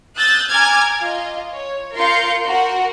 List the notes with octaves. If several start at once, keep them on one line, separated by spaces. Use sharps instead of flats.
D#6 E6 F#6 G6 A6
G#5 A#5 D6 F6 G#6
F4 D#5
C#5
F4 A#4 F5 C6 G6 C#7
F#4 A#4 F#5